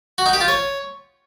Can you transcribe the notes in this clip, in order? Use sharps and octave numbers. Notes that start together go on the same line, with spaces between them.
F#4
D#4
G4
F4
C#5